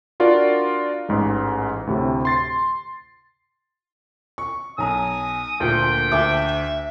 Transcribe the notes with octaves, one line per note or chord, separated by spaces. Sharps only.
D4 F4 F#4 A#4 D5
A1 G#2 G#3
D2 A2 C3
C6 A6 C7
C#6
B1 G#5 A#5 D#6
D2 A#2 G5
D2 E5 D6